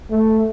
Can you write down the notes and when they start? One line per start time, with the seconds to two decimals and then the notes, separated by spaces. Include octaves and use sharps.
0.11 A3